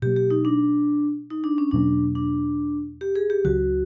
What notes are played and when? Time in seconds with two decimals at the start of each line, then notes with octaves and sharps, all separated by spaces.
0.02 B2 F#3 A#3 G4
0.16 G4
0.30 D#4
0.45 D4
1.30 D#4
1.44 D4
1.58 C#4
1.71 E2 B2 F#3 A#3 D4
2.15 D4
3.01 G4
3.16 G#4
3.30 G4
3.45 C#2 C#3 F#3 F#4